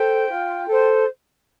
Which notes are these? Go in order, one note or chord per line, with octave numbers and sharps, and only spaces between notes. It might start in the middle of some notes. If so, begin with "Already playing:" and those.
Already playing: A4 C5 G5
F4
A4 C5